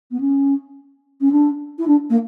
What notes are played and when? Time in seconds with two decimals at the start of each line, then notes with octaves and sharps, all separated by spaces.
0.11 B3
0.20 C#4
1.21 C#4
1.32 D4
1.79 E4
1.87 D4
2.10 A#3